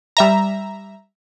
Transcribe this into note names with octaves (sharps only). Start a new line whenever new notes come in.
G3 E5 A#5